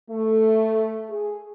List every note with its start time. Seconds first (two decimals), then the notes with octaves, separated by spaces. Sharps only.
0.10 A3
1.09 G#4